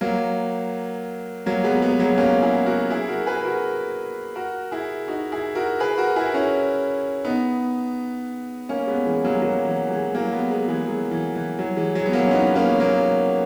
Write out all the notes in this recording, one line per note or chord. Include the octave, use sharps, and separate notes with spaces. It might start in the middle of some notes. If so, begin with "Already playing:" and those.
F#3 A#3
F#3 A#3
G#3 B3
G#3 B3
F#3 A#3
B3
A#3 C#4
E4 G#4
F#4 A#4
E4 G#4
F#4 A#4
G#4 B4
F#4 A#4
F#4 A#4
E4 G#4
D#4 F#4
E4 G#4
F#4 A#4
G#4 B4
F#4 A#4
E4 G#4
C#4 E4
B3 D#4
A#3 C#4
G#3 B3
E3 G#3
F#3 A#3
G#3
F#3 A#3
E3 G#3
E3 G#3
F#3 A#3
G#3 B3
G#3 B3
E3 G#3
F#3
E3
E3
F#3
E3 G#3
F#3
B3
F#3 A#3
C#4
B3 D#4
A#3 C#4
F#3 A#3